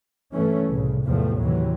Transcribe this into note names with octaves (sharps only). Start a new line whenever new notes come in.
G2 E3 A3 C#4
C2 A2 C#3
A1 E2 A2 C3 F3 A3
D#2 C3 E3 F#3